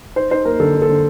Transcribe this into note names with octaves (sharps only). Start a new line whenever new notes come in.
D#4 C5
D#4 C5
A#3 A#4
D3 A4
D3
A4
D3